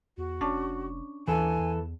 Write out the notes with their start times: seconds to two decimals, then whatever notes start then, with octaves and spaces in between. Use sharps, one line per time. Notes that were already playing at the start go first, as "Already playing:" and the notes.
0.17 E2 F#4
0.41 F1 C#4 D4
1.28 D#2 E3 A4 G#5
1.59 E2